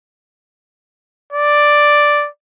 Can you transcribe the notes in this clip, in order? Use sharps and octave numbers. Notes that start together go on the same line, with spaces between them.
D5